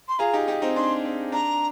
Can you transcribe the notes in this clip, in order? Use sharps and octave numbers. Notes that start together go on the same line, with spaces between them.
C6
F4 G#4 A#5
D#4 G4
D#4 G4
C4 D#4
D4 C6
C4
D4 A#5